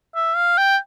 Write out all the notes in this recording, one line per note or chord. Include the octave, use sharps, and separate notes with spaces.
E5
F5
G5